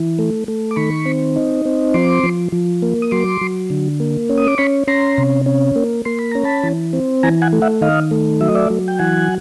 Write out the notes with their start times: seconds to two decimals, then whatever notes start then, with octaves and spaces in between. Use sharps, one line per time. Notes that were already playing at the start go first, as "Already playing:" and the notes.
Already playing: E3
0.19 A3
0.48 A3
0.71 D6
0.76 D#3 B5 C#6
1.06 C4
1.36 D#4
1.65 C4
1.94 F3 C6 D6
2.23 F3
2.52 F3
2.82 A#3
3.02 D#6
3.11 F#3 C6 D6
3.41 F#3
3.70 D3
4.00 A#3
4.30 C#4
4.38 D#6
4.47 D6
4.58 C#4 B5 C#6
4.87 C#4 A#5 C6
5.18 C3
5.46 C#4
5.76 A#3
6.05 A#3 C6
6.19 B5
6.31 C#4 A#5
6.44 A5 B5
6.63 E3
6.93 C4
7.23 E3 G#5 A#5
7.42 F#5 G#5
7.53 A3
7.62 E5 F#5
7.81 D#3 D#5 F5
8.11 A3
8.41 F#3 E5
8.48 D#5
8.55 D5 E5
8.70 F#3
8.88 G5
8.99 E3 F#5 G#5